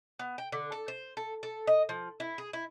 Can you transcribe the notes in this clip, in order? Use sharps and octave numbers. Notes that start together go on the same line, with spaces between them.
B3
G5
D3
A4
C5
A4
A4
D#5
F3
E4
G#4
E4